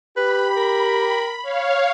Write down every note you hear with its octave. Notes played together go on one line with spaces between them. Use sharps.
G4 B4 B5
A#4
C#5 F5